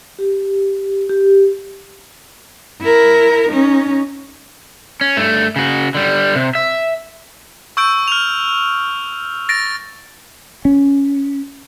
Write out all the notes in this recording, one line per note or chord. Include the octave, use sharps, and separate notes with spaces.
G4
G4
E4 A#4
C#4 D#4
C#4
G2 A3
C#3 F#4
D3 G3
C3
E5
C#6 E6 G6 D7
F6 F7
A6 A#6 D7
C#4